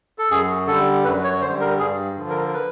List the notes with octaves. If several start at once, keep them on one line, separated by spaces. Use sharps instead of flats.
A4
F#2 G#4
D3 G3 A4
F#2 B4
C#5
D3 C5
G3
A#4
G2 G#4
D3 F3
A#4
A#4
B4